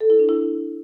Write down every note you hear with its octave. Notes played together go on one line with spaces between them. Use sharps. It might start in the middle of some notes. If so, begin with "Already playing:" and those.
A4
E4
D4
E4